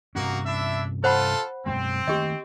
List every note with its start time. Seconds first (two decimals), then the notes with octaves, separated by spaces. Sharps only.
0.15 G2 C3 A#3 C#4 D#4 F#4
0.46 D4 E4 E5
1.04 A3 F4 A4 C5 F#5 B5
1.66 F#2 B2 G#3 C4
2.08 D#3 A3 A#3 G4 D#5